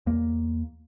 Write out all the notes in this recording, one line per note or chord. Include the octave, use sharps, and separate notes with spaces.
E2 A#3